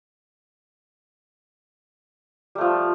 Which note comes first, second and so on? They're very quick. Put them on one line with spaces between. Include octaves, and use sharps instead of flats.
G3 A3 F3